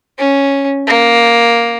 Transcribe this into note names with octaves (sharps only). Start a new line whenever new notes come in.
C#4
A#3